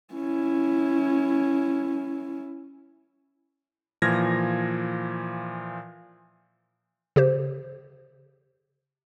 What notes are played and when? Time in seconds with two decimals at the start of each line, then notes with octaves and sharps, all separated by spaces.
0.14 C#4 E4
4.02 A#2 E3 F3 F6 G#6 A#6
7.16 C#3 G4 C5